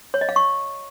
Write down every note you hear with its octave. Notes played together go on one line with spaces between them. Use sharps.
C#5
D#5
F5
C#6